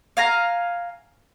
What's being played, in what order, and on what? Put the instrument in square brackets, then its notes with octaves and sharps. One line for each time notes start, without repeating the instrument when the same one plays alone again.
[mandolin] F5 G#5 A#5